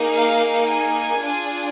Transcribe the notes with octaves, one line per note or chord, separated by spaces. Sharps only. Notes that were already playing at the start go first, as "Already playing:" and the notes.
Already playing: A#3 D#4 G#4
F5
G#5
D4 F4 G#4